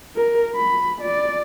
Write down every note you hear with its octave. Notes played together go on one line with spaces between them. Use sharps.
A#4
B5
D5